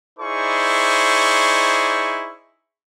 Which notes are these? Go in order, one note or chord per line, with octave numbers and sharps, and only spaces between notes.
D#4 E4 G#4 C5 D5 C#6